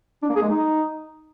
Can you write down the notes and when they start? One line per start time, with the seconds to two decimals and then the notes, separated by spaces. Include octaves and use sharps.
0.23 D4
0.29 A#3
0.36 G#4
0.42 G#3
0.48 D#4